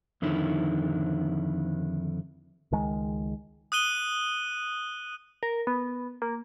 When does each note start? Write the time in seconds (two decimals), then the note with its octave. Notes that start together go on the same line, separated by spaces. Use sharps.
0.22 F2 D3 D#3 E4
2.72 C#2 D#3 G#3
3.72 D#6 F#6 D#7 G7
5.43 A#4
5.67 B3
6.22 A#3